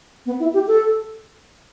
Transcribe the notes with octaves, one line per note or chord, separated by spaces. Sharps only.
B3
E4
G4
A4